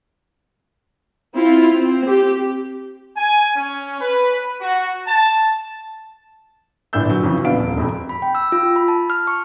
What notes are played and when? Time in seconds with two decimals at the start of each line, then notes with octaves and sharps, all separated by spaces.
1.35 C4 E4 F4
1.74 C4
2.07 G4
3.17 G#5
3.56 C#4
4.00 B4
4.61 F#4
5.07 A5
6.93 G1 A#2 D4 E4 E6 G6
7.08 D3 F#3
7.23 F2 C#3 E3 F3 C#4
7.45 A#1 B3 D4 F5 D7
7.59 D#1
7.77 E1 F2 B5
8.09 B5
8.22 G5
8.35 E6
8.52 F4
8.76 B5
8.88 A5
9.10 F6
9.27 C#6